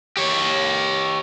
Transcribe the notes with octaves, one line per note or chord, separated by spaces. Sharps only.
G4 C#5